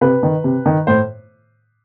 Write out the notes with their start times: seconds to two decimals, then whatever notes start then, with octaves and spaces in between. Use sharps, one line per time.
0.01 C3 B4
0.23 D#3
0.44 C3
0.66 D#3
0.87 A2 C5